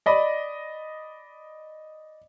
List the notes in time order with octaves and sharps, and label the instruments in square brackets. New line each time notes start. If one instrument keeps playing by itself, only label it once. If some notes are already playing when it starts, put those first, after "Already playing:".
[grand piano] D5 D#5 B5